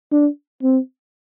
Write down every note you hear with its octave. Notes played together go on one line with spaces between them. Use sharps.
D4
C4